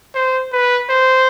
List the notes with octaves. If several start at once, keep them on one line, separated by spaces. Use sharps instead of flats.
C5
B4
C5